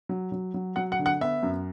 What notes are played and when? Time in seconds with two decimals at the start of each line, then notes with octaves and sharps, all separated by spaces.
0.09 F#3
0.32 F#3
0.54 F#3
0.76 F#3 F#5
0.92 F#5
0.99 D3
1.06 F#5
1.21 B3 E5
1.43 F#2